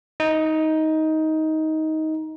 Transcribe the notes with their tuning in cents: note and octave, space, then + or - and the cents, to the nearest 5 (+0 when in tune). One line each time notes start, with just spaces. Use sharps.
D#4 +15